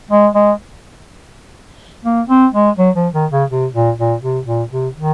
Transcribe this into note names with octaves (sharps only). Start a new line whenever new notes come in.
G#3
G#3
A#3
C4
G#3
F#3
F3
D#3
C#3
C3
A#2
A#2
C3
A#2
C3
D#3